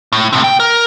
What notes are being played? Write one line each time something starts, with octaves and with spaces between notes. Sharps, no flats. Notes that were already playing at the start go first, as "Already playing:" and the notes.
A2
A2 C3
G5
A#4